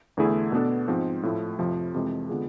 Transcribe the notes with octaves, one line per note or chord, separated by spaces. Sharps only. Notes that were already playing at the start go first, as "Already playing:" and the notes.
E2 D3 A3 E4 G#4
B2 B3 D4 A4
G#2 F3 G#3 C4
A2 F3 A3 E4
F2 C3 F3
F2 C3 E3 G#3
D3 G#3 B3 F4 G#4